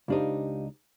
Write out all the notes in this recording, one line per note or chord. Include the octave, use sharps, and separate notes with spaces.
C#2 D4 D#4 F4 G4 C5